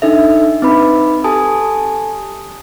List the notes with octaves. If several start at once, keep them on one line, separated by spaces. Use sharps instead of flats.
D4 D#4 A4 E5
C4 D#4 B4 B5
G4 A4 G#5 A5 D#6